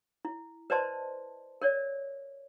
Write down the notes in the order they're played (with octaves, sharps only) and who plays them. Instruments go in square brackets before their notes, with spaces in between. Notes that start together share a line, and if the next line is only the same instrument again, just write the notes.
[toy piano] E4
B4 C5 D5 D#5 A5 C6
A#4 C#5 D5